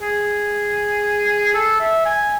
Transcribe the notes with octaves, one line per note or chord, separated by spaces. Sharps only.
G#4
A4
E5
G#5